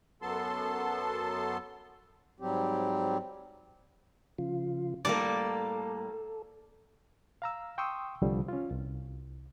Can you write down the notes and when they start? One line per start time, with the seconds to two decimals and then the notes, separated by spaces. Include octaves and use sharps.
0.22 F#2 F#3 B3 A4 A5 C6
2.40 G#2 F#3 G3 C4 G4
4.38 C#3 F3 F4
5.05 A2 G3 A#3 A4 D5
7.42 F5 A#5 E6
7.78 G5 C6 C#6 D#6 E6
8.22 C2 D3 F3 G3
8.48 C#4 F4
8.71 C2